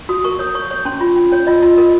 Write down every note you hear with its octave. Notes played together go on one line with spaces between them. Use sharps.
F#4 D#6
A#4 C#6
C#5 D#6
C#5 C#6
C#5 C#6
C#4 C6
F4
C#4
C#4 C#5
F4 D#5
F4 D#5
A#4 D#5